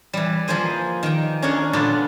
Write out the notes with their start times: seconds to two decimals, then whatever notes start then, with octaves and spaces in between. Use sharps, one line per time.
0.13 E3 G3
0.48 F3 A#3 G#4 C5 D#5
1.03 D#3 A#3 G5
1.42 C#4 D4 G#4 A#4 C#5
1.73 A#2 D3 B3 D4 F4